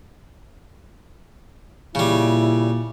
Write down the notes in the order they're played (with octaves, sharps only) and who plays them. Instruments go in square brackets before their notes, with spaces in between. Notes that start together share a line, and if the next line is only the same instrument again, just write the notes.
[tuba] A#2 [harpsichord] C#3 G3 [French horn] E4